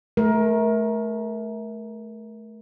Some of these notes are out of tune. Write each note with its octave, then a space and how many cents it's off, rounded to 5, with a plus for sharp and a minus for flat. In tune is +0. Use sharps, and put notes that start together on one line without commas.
A3 -25 A#4 +20